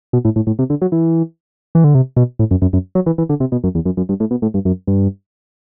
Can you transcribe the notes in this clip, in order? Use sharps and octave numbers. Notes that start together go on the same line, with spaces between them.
B2
A2
A2
A2
C3
D3
F#3
E3
E3
D3
C3
B2
A2
F#2
F#2
F#2
F#3
E3
E3
D3
C3
B2
F#2
E2
F#2
F#2
G2
A2
B2
A2
G2
F#2
G2